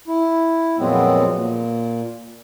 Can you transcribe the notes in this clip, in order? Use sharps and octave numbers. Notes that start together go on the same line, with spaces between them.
E4
F2 A#2 F#3 G#3 B3 C4
A#2